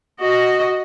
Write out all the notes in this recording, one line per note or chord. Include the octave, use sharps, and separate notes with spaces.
F#4 D#5